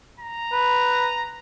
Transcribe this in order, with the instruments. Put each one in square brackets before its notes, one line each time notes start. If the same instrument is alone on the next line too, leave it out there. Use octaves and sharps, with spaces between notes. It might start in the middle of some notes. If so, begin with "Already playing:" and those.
[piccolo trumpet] A#5
[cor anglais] B4